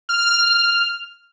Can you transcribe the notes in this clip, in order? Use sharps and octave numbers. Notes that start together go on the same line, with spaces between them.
F6